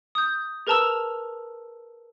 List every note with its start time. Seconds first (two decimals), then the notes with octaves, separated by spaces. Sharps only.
0.15 D#6 G6
0.67 G#4 A#4 B4 A5 A#5 E6